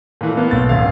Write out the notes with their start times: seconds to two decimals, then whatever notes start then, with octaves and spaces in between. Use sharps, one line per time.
0.21 A#2 E3 A3
0.37 A#3 B3
0.51 B1 B3 A6
0.69 D1 F#2 F5